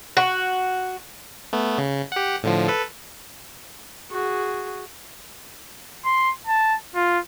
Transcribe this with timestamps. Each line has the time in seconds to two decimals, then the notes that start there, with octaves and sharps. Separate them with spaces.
0.17 F#4
1.53 A3 B3
1.78 C#3
2.12 G4 F#5
2.43 A2 D3 F3
2.68 A4 B4
4.11 F#4 G#4
6.05 C6
6.47 A5
6.95 F4